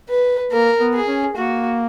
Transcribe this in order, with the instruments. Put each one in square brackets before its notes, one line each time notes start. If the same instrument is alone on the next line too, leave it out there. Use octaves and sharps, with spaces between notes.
[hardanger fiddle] B4
[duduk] A#3 [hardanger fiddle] A#4
[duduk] B3
[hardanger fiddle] G#4
[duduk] C#4
[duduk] A#3 [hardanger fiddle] F#4